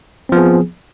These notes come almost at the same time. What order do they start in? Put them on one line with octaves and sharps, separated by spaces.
C4 F3 B3 G#4